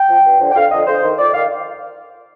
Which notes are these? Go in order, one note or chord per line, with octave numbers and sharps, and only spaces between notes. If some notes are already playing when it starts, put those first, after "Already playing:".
Already playing: G5
F3
G2
D3 F3
G5
F2 F5
D3 F3 D#5
F2 C5
D#3
F2 D5
D#3 F5